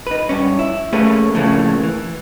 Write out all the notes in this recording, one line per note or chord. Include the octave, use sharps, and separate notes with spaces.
D#4 B4
G2 C#4
E4
A3 A#3 C#4 G4 G#4 B4
F2 A2 C#3 E3 A#3
E3